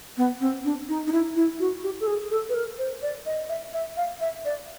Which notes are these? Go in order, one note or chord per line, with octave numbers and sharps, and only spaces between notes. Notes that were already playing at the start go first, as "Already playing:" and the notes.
B3
C4
D4
D#4
D#4
E4
E4
F#4
G4
A4
G#4
A4
B4
A#4
C5
D5
D#5
E5
E5
F5
E5
D5